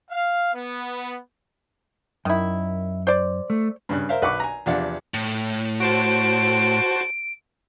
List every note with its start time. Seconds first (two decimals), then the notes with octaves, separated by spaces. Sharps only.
0.11 F5
0.54 B3
2.25 F#2 D#3 E4
3.07 C5 D5
3.50 A3
3.89 G2 C#3 F#6
4.09 A#4 C5 E5 F5
4.22 B1 B4 F#5 C#6 D6
4.40 G#5 A#5
4.66 E2 C3 F3 D4 F5 F#5
5.14 A2
5.80 F#4 C5 A5 D7